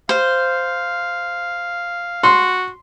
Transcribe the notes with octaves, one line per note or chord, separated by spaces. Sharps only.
C5 F5
F#4 C6